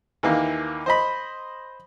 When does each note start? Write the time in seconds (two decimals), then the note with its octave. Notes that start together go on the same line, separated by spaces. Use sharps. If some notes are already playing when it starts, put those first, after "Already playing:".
0.23 D#2 E3 A#3
0.86 C5 D#5 B5